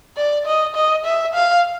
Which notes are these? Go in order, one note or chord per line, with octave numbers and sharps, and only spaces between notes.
D5
D#5
D#5
E5
F5